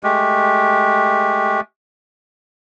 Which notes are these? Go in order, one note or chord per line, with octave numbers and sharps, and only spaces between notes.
G#3 A3 G4